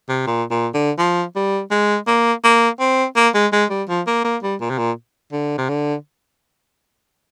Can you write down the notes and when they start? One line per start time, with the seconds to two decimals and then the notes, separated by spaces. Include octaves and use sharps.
0.09 C3
0.27 A#2
0.51 A#2
0.74 D3
0.98 F3
1.35 G3
1.71 G#3
2.07 A#3
2.44 A#3
2.80 C4
3.16 A#3
3.34 G#3
3.53 G#3
3.70 G3
3.89 F3
4.07 A#3
4.24 A#3
4.43 G3
4.61 A#2
4.70 C3
4.78 A#2
5.32 D3
5.58 C3
5.69 D3